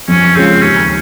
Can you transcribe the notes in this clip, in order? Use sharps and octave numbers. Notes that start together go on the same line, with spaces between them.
F2 C#4
C#3 G#3 C4 C#4 F4
D#2 C#4